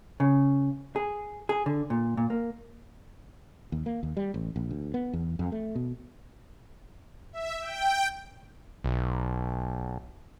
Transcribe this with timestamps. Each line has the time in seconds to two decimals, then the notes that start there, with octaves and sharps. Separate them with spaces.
0.20 C#3
0.96 G#4
1.49 G#4
1.66 D3
1.90 A#2
2.17 A#2
2.30 A#3
3.72 D#2
3.86 A#3
4.03 D#2
4.17 G3
4.34 A1
4.56 A#1
4.70 D2
4.94 B3
5.13 E2
5.39 F2
5.52 A3
5.75 B2
7.33 E5
7.61 G5
8.84 B1